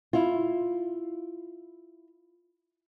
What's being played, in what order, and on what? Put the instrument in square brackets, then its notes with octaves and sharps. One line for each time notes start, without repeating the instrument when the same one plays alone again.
[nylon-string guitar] E4 F4